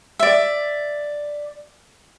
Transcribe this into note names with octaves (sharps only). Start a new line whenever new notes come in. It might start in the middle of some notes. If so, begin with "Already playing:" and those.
D5 E5